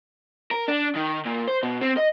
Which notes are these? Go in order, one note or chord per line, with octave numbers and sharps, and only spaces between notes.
A#4
D4
D#3
A#2
C5
B2
C4
D#5